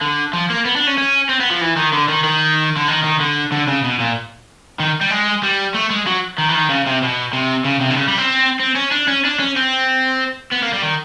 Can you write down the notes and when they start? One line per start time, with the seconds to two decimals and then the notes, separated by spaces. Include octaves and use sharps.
0.02 D3
0.33 F3
0.50 A#3
0.65 B3
0.76 D4
0.87 C#4
0.98 C#4
1.29 C4
1.41 B3
1.51 F3
1.61 E3
1.77 D#3
1.93 D3
2.09 D#3
2.24 D#3
2.77 D3
2.88 D#3
3.04 D#3
3.21 D3
3.52 D3
3.68 C#3
3.84 B2
4.00 A#2
4.80 D#3
5.01 G3
5.11 G#3
5.43 G3
5.74 A3
5.90 G#3
6.07 F#3
6.38 D#3
6.49 E3
6.54 D#3
6.69 C#3
6.86 C3
7.02 B2
7.33 C3
7.65 C#3
7.81 C3
7.90 D3
7.97 C#3
8.08 G3
8.18 C4
8.60 C4
8.76 C#4
8.92 D4
9.08 C#4
9.25 D4
9.40 C#4
9.56 C4
10.52 B3
10.62 A#3
10.73 G3
10.82 D#3